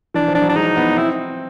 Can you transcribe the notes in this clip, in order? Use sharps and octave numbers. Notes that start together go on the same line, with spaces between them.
E3 D4
F3
D4
F#3
D4
G#3 D#4
B3
C4 E4